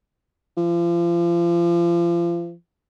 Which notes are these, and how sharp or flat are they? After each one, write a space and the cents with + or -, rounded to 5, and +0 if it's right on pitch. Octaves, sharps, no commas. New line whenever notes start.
F3 -35